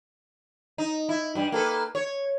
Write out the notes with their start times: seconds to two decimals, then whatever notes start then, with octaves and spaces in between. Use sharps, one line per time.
0.78 D#4
1.09 E4
1.35 G2 G3
1.52 A#3 A4 B4
1.95 C#5